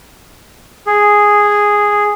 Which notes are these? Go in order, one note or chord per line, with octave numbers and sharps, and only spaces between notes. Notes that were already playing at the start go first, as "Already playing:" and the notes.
G#4